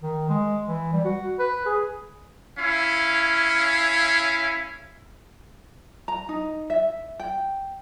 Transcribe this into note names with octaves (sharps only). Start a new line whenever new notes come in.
D#3
G#3
E3
G3
F#4
B4
G#4
C#4 E4 F5
A#5
D#4
E5
G5